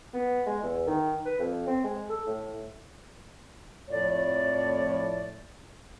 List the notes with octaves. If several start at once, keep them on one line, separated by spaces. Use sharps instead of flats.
B3
G#3
E2
D#3
B4
F2
C4
G#3
A4
A2
F2 A2 C#5 D5